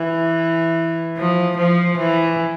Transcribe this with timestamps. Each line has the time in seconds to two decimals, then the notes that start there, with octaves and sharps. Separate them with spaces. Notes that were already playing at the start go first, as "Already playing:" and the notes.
Already playing: E3
1.17 F3
1.57 F3
1.97 E3